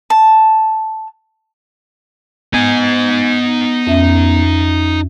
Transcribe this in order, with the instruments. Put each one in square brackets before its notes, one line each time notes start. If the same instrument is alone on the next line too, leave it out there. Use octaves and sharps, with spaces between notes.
[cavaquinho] A5
[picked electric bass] B3 [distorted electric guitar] D#4 G#5
[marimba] F2 C#4 E5